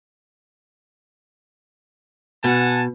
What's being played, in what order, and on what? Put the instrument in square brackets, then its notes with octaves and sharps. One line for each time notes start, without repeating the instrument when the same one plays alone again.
[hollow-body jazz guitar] B2 [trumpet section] F#5 G#5 A5